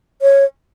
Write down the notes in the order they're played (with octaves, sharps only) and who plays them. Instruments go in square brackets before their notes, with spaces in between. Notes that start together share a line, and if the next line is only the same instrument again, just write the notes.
[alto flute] C#5